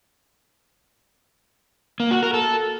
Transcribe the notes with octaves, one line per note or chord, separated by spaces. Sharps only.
A#3
F#4
A#4
A4